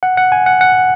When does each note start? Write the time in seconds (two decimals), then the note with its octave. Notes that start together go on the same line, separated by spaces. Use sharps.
0.03 F#5
0.17 F#5
0.32 G#5
0.46 F#5
0.61 F#5